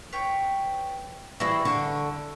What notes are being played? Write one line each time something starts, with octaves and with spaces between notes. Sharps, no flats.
B4 C#5 G5
E3 G3 E4 F#4 G#4
D3 C#6